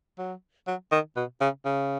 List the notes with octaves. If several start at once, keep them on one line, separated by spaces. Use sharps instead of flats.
F#3
F#3
D#3
B2
C#3
C#3